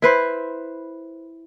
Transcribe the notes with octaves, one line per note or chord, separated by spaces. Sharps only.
E4 B4 C5